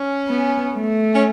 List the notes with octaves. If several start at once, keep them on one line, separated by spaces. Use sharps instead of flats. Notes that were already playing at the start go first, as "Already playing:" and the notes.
Already playing: C#4
B3
A3
C#4